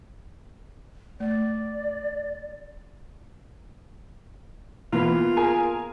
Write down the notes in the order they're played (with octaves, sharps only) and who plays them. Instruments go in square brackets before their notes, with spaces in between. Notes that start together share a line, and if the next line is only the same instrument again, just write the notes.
[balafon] A3 [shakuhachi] D5
[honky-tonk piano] E3 [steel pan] A#3 B3 B4 [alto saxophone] F4
[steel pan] G#4 [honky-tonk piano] A#4 G#5